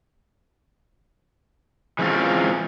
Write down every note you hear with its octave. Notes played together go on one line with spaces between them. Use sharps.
E3 G#3 C4 C#4 F4